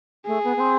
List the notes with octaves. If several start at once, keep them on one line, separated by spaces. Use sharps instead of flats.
A3 G#4
B3
B3
C4